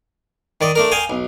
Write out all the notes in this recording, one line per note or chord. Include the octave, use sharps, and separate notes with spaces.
D#3 D5 D#5
A3 D4 A#4
F5 G5 G#5 A#5 D#6
B1